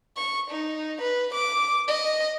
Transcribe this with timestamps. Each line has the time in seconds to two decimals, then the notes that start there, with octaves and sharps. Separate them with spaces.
0.17 C#6
0.51 D#4
1.02 B4
1.34 D6
1.88 D#5